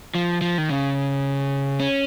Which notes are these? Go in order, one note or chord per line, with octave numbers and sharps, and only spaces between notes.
F3
F3
D#3
C#3
C#4